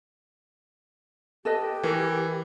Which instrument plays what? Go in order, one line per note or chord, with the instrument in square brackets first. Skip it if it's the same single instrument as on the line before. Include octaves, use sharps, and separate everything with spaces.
[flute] G4 [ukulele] A4 B4 D#5
[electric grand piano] E3 [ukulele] F#4 A#4